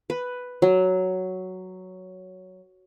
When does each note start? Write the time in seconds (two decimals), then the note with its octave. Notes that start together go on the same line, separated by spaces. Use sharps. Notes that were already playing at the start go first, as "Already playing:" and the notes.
0.10 B4
0.62 F#3